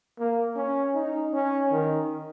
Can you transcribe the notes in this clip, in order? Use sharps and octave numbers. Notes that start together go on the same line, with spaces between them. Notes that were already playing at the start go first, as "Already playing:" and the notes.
A#3
C#4
D#4
C#4
D#3